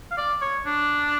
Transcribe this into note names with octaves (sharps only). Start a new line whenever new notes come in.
F5
D5
C#5
D4